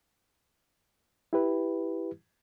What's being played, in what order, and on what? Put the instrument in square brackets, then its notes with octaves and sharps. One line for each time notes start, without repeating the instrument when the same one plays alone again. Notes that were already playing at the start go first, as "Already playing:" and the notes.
[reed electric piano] E4 G4 B4